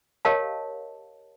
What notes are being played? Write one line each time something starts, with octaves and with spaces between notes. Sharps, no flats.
G4 A#4 C#5 D#5 F5 A5